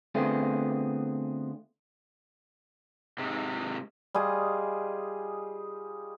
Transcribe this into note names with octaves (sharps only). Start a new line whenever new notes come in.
D3 A3 B3 C4 F4 G#4
G#2 C3 G#3
G3 F4 G#4 D#5